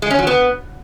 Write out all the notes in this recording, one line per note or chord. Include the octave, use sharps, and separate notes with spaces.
G#3
C#4
F#3
B3